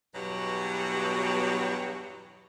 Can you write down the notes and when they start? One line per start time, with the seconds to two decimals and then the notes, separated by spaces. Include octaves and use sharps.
0.15 E2 G2 B2 F#3 F#4 G4